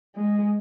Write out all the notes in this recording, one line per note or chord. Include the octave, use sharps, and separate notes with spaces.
G#3